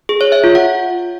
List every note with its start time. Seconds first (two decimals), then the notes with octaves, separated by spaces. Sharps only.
0.09 G#4
0.21 C#5
0.32 E5
0.44 F4
0.55 F#5